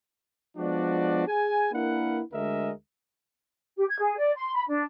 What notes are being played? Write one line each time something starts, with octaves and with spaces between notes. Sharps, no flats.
F3 G#3 B3 D4 F#4 D5
G#4 G#5
A#3 D4 E4 A#4 B4 F#5
D2 D3 G#3 A#4 D#5 E5
G4
G#6
G#4
D5
C6
B5
D4